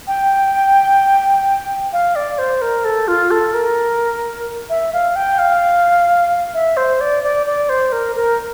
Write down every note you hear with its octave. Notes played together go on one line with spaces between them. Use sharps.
G5
F5
D5
C5
A#4
A4
F4
A4
A#4
E5
F5
G5
F5
E5
C5
D5
D5
D5
C5
A#4
A#4